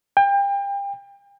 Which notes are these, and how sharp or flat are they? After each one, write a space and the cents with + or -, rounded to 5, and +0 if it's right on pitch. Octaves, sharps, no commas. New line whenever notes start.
G5 +30